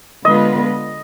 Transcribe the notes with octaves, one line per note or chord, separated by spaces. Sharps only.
D3 G#3 B3 F4 B4 D#5